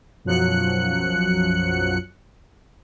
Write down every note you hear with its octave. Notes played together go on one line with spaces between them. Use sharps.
B1 F#2 F3 F#3 F#6 C#7